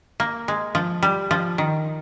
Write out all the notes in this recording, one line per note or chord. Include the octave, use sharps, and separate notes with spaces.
A#3
G#3
F3
G3
F3
D#3